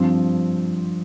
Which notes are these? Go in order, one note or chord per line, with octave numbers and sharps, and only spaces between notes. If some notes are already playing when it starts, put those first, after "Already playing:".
Already playing: G2 F3 C4